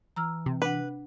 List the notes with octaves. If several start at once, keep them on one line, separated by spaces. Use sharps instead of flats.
E3 A#5 E6 F6
C3
D4 B4 F#5